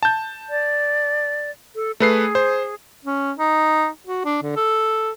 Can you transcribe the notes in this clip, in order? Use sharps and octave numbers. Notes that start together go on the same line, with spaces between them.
A5 G6
D5
A4
A3 G#4 B4 C7
C5
C#4
D#4
F#4
D4
D3
A4